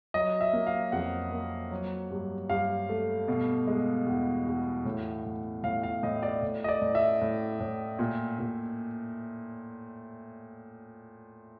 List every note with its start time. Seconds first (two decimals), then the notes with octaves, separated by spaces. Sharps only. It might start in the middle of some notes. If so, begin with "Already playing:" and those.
0.14 F#3 D#5
0.41 E5
0.53 A#3
0.67 F5
0.92 F2 F#5
1.32 A#3
1.71 F#3
2.11 G2
2.50 G2 F5
2.89 A3
3.28 B2
3.67 G#3
4.06 E2
4.46 E2
4.85 A2
5.25 A2
5.63 A2 F5
5.83 F5
6.03 A2 D#5
6.23 D5
6.42 A2
6.64 D#5
6.68 D5
6.81 A2
6.95 E5
7.21 A2
7.60 A2
7.99 A#2
8.39 A#2